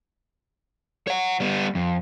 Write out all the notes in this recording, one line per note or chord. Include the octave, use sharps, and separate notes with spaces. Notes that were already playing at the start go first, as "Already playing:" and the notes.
C#5 F#5
G3 B3
F2